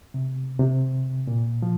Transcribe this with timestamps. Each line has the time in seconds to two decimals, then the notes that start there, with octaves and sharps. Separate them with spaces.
0.14 C3
0.59 C3
1.27 A#2
1.62 F3